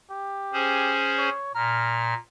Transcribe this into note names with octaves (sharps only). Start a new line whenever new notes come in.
G4
C#4 G#4 C5
C#5
A#2 A#5 F6